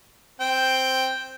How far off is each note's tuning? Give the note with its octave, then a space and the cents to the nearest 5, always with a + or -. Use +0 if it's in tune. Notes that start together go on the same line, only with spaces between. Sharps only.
C4 +0 G5 +0